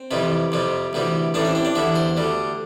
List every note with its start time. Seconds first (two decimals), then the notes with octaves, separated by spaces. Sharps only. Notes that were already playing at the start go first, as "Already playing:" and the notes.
Already playing: C4
0.11 F2 C3 E3 G3
0.52 F2 C3 G3
0.93 D2 C3 E3 G3
1.34 A1 A2 E3 G3 D4
1.45 C4
1.55 C4
1.65 D4
1.75 E2 D3 G3 E4
1.96 C5
2.17 D2 D3 G3